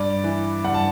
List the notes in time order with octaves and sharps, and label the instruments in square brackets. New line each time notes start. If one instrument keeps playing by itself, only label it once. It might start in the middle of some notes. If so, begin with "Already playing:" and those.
Already playing: [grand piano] G2 D5
E3
G2 F#5
A5